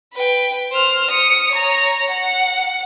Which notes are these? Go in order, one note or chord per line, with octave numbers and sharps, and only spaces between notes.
B4 G5
C5 F6
D#6 C#7
C#5 A#5
F#5